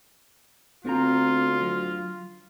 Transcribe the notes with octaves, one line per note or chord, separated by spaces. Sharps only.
D2 B3 C4 F4 A#5
F#3